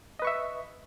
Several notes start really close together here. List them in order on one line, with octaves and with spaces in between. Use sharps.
D#5 B4 C#6 E5